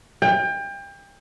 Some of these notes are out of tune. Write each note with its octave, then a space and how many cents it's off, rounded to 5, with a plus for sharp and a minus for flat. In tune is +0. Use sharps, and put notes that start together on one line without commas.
G5 +30